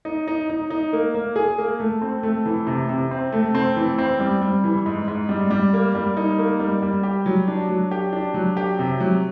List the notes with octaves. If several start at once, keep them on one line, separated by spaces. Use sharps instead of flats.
D#4
D#4
D#4
D#4
A#3
A#3
G#4
A#3
A3
C4
A3
E3
C3
C3
C4
A3
C4
E3
C4
G3
G3
E3
G#2
G#2
G3
G3
A#3
G3
D#4
A#3
G3
G3
G4
F#3
D4
F#3
G4
D4
F#3
G4
C3
F#3